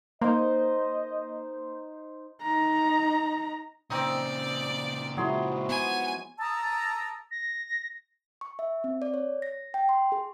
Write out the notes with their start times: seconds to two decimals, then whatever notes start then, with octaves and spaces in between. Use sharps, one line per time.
0.22 A#3 D#4 C5 D#5
2.42 D#4 A#5
3.90 A#2 C#3 C4 D#4 D5 D#6
5.17 F3 F#3 G#3 E4 G#4 C6
5.69 B3 F#5 G#5 B5
6.39 A5 A#5 D#6 E6
7.31 A#6
8.41 C#6
8.59 E5
8.84 C4
9.02 D5
9.14 C#5
9.42 A#6
9.74 G5
9.89 C6
10.12 G#4